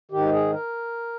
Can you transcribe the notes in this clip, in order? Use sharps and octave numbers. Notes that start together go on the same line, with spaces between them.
G#2 D#3 G4
G#4
A#4